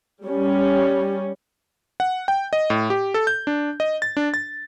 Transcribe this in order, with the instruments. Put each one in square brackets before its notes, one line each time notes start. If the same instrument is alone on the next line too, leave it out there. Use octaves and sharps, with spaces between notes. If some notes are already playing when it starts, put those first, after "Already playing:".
[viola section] G3 C#4
[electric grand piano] F#5
G5
D#5
A2
G4
A4
G6
D4
D#5
A6
D4
A6